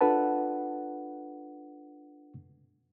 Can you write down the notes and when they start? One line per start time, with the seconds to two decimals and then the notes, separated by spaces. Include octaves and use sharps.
0.01 D4 F4 A4 B4 F#5 A5